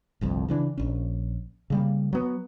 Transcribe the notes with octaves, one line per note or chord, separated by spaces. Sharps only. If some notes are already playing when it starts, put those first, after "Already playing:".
G1 C2 F2
C#3 E3 D4
A#1 C#4
C#3 G3 A#3
F#3 B3